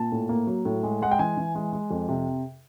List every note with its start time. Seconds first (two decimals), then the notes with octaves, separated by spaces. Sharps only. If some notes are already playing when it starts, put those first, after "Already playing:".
Already playing: A#2 A5
0.12 A2
0.29 A#3
0.47 F#3
0.65 A2
0.83 G#3
1.02 G#3 F#5
1.11 G5
1.19 E3 G#5
1.37 E3
1.55 G#3
1.72 G#3
1.91 F2
2.08 C3